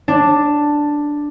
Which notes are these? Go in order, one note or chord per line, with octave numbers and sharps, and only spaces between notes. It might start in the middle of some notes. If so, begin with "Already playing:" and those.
D4